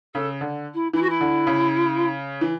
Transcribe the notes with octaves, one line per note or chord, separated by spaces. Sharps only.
C#3 A4
D3
E4
E3 E4
F#4
E4
D3
C#3
E3